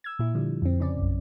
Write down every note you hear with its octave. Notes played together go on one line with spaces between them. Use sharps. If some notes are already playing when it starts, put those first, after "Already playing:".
E6 G#6
A#2 E4
D3 F3 G3
F2 C4
C#3 C#4 D5
A#1 F#2